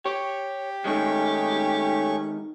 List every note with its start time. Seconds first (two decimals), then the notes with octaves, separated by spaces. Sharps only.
0.06 G4 C#5
0.85 D#3 G#3 A3 C#4 C#6